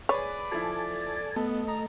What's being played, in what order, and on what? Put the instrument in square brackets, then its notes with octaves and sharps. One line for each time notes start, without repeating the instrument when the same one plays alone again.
[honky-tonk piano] G#4 B4 [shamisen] C#5 [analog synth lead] D5
[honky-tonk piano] F3 E4 [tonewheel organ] A4 G#5 A5
[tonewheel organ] A3 D#5 [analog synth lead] B3 [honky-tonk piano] A4
[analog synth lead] A#5